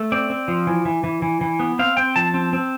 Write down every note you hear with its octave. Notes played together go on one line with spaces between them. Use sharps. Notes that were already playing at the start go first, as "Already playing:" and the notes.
Already playing: A3
C4 D5
C4
F3
E3
E3
E3
E3
E3
B3
C4 F5
C4 G5
F3 A5
C4
C4